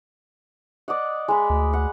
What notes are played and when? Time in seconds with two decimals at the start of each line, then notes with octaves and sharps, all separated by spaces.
0.88 D5 D#5 F#5
1.28 G#3 B5
1.50 D2
1.73 F#5